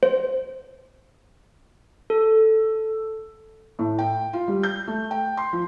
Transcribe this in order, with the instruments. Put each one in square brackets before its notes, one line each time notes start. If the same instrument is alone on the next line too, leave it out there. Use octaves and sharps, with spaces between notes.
[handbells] C5
A4
[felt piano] A2
G5
F4
G3
G6
A3
G5
C6
F3